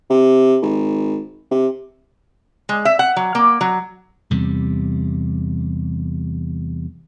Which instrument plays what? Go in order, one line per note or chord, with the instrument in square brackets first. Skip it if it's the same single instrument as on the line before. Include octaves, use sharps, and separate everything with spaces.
[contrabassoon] C3
G#1
C3
[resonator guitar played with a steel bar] G#3
E5
F#5
F#3
A#3
F#3
[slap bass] E2 C3 G3